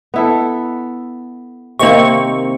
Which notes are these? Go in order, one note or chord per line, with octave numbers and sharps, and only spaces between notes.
B3 E4 A4
C3 D#3 A#3 C4 C#6